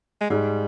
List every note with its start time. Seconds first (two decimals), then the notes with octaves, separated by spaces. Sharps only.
0.21 G#3
0.30 G#2 G3